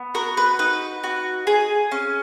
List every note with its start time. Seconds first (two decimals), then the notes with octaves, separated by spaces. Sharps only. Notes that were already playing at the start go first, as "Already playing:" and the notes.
Already playing: B3
0.15 F#4 A#4
0.37 B4
0.59 D#4 B4
1.03 F#4
1.47 G#4
1.92 C#4